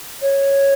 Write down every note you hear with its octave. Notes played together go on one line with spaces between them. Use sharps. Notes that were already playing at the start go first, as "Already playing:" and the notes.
C#5